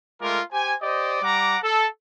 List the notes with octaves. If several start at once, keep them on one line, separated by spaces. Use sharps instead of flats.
G#3 A3 F4 A#4 D6
G4 C5 G#5
G4 C5 D5 D#5
G3 F#5 A#5 D6
A4